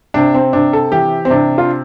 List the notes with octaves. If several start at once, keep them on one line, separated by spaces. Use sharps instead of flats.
C3 D4
C4
C3 D4
A4
E3 G4
C4
C3 D4
F4